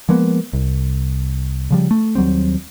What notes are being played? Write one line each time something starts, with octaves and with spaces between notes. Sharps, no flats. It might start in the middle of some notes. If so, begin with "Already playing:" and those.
F3 G#3 A#3 B3
C2
C#3 F3 G3
A3
D#2 F#3 G3 C4